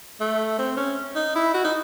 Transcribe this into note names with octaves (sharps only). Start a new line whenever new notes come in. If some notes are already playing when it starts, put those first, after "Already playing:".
A3
C4
C#4
D#4
E4
F#4
D#4